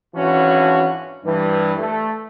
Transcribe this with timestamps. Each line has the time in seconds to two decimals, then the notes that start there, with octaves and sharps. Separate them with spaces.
0.15 G#1 E3 C#4 D4 F4 F#4
1.24 G2 E3 G3
1.78 A3